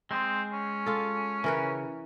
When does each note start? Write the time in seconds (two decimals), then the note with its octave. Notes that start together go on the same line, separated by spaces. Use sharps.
0.11 G#3 C4 C6 D#6
0.53 C#4
0.86 F4 A4
1.44 C#3 E3 A#4 B4